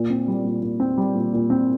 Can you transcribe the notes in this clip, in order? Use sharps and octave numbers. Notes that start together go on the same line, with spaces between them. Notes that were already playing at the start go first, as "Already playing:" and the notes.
Already playing: A#2
C4
G3
A#2
A#2
C4
G3
A#2
A#2
C4